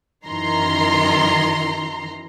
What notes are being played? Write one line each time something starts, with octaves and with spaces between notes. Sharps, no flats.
F#2 D#3 E3 A#5 C6